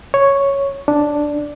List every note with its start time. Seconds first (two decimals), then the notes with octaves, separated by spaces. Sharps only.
0.14 C#5
0.88 D4